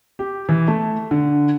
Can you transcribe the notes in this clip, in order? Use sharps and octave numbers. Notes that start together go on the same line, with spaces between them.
G4
E3
A3
D3